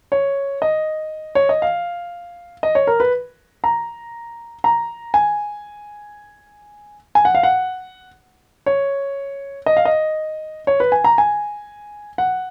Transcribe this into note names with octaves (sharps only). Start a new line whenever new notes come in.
C#5
D#5
C#5
D#5
F5
D#5
C#5
A#4
B4
A#5
A#5
G#5
G#5
F#5
F5
F#5
C#5
D#5
F5
D#5
C#5
B4
G#5
A#5
G#5
F#5